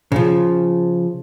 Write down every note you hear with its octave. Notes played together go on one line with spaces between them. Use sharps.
C#3 F3